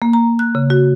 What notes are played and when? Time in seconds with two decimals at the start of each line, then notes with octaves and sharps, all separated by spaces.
0.02 A#3
0.13 A#5
0.39 F#6
0.55 C#3
0.70 F#4